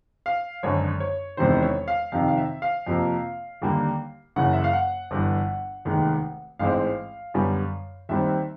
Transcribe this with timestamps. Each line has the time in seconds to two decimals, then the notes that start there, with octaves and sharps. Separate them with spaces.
0.26 F5
0.63 G#1 F#2 D3 C#5
1.00 C#5
1.37 E1 E2 C3 D#3 C5
1.62 C#5
1.88 F5
2.12 F2 C3 D#3 F5
2.28 F5
2.37 E5
2.62 F5
2.87 F2 C3 F3 A#3
3.62 D#2 D3 G3 A#3
4.36 F#1 F#2 C#3 E3 F#5
4.53 E5
4.64 F5
4.73 F#5
5.11 G1 G2 E3
5.85 F1 D#2 D#3 G#3
6.59 A1 G#2 E3 G#3 C4 F5
7.34 F#2 D3 G3 B3
8.09 D#2 D#3 G3 C4 E5